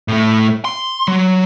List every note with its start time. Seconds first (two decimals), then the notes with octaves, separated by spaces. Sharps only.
0.08 A2 A3
0.65 C6
1.08 F#3